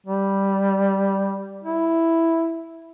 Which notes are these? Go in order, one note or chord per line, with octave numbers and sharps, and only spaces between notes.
G3
E4